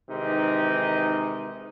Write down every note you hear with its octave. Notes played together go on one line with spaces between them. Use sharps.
C3 D#3 E3 G#3 D#4